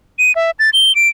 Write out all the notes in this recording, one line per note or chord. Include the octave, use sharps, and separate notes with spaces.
D#7
E5
A6
G7
D7